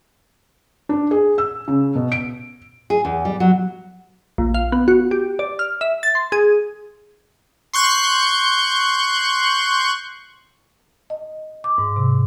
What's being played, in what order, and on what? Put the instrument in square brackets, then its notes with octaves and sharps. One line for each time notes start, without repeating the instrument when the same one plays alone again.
[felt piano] D4
G#4
E6
C#3
B2
D7
[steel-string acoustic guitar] G#4
E2
G3
F#3
[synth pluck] A#1
F5
B3
F#4
G4
D5
F6
E5
A6
C6
G#4
[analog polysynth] C6 C#6 F#6 G6
[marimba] D#5
D6
G#2
C3